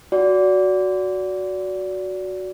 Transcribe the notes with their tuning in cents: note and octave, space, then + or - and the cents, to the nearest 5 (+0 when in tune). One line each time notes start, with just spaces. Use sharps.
F#4 +0 D5 -25